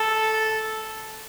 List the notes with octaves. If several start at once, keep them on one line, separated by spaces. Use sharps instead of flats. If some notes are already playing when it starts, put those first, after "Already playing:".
Already playing: A4